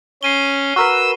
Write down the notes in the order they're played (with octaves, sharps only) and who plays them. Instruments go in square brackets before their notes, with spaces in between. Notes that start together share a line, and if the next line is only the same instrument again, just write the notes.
[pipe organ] C#4 [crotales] C7 D#7 G7
[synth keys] F#4 A#4 B4 [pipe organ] E6